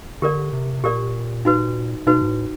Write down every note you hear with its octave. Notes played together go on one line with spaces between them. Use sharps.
D3 G4 A#4 D5
C3
A#2 G4 A#4 D5
D#4 F#4 B4
B2 D#4 F#4 B4
G#2
A2